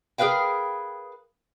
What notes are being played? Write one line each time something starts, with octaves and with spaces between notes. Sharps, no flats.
G#4 A#4 B4 F5 G5